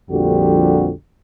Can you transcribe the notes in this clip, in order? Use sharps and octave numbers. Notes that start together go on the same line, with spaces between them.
A#1 F2 D3 G3 F#4 G4